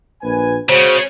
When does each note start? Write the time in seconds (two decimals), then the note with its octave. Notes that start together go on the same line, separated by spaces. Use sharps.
0.22 A#1 B4 G#5
0.69 C#3 G#3 F#4 C5